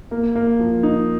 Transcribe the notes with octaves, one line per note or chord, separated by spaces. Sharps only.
A#3
A#3
F3
D#4